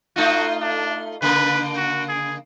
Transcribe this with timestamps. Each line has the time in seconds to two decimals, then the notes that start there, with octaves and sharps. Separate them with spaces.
0.16 A3 D#4 F4 F#4
0.61 D4
1.22 C#3 A#3 B4
1.76 F#4
2.08 G#4